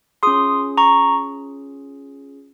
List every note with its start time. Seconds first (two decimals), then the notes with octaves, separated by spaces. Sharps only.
0.23 C#4 F4 G#4 C6 D#6
0.78 A#5 C#6